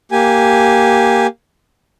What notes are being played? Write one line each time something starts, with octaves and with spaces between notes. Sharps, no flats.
A#3 G4 G#5